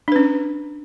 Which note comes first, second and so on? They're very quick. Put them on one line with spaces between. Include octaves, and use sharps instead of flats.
D4 B4 C#4